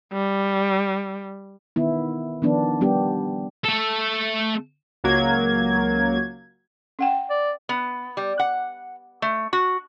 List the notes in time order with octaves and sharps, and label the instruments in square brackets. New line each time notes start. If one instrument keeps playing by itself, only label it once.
[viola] G3
[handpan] D#3 B3 E4
D#3 F3 B3 D4
G3 B3 D4 G4
[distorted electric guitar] A3 A4
[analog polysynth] C#2 F#3 A#3 G#6
[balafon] C#4 F#5 G5
[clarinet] D5
[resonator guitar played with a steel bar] B3
G3
F#5
A3
F#4